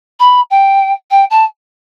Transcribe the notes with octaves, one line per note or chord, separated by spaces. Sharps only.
B5
G5
G5
A5